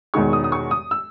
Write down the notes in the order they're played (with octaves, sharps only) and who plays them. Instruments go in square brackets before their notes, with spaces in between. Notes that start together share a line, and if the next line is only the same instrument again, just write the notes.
[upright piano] E1 E2 D#3 G#3 C#6
D#6
D#6
C#6
D#6
E6